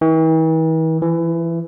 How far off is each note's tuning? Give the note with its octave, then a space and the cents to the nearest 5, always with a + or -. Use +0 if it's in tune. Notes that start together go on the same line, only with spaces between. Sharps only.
E3 -45
E3 +20